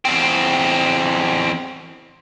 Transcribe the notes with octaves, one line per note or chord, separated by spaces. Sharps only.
E2 C4